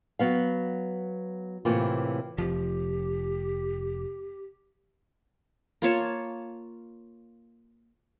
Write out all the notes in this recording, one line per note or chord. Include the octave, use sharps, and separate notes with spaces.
F#3 B3 F5
A2 C3 E3 A#3 F4
F1 F3 G4
A#3 F4 C#5 A5